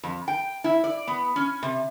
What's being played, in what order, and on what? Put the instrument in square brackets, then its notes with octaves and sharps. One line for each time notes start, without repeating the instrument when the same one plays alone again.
[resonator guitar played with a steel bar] F2
G5
E4
D5
B3
C#4
C3